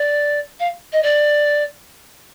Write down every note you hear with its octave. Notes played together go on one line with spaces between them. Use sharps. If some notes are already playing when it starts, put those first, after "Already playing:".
Already playing: D5
F5
D#5
D5